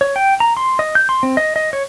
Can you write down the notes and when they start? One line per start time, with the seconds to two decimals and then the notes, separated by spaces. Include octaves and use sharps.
0.01 C#5
0.16 G5
0.40 A#5
0.57 C6
0.79 D#5
0.95 G6
1.09 C6
1.23 C4
1.37 D#5
1.56 D#5
1.73 C#5